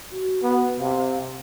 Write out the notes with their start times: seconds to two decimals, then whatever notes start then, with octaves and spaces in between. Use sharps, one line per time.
0.11 F#4
0.43 B3
0.80 C3 F5